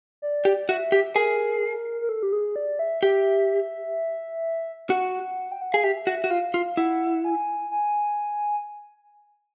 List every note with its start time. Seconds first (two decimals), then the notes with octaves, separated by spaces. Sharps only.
0.22 D5
0.45 G4
0.69 F#4 E5
0.92 G4
1.15 G#4 A#4
2.01 A#4
2.09 A4
2.23 G4
2.32 G#4
2.56 D5
2.79 E5
3.03 G4 E5
4.90 F#4 F#5
5.52 G5
5.62 F#5
5.73 G#4 F5
5.84 G4 E5
6.07 F#4
6.24 F#4
6.30 F4 F5
6.54 F4
6.77 E4 F#5
7.25 G#5
7.71 G#5